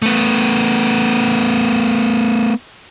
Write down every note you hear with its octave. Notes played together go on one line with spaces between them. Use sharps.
A3 B3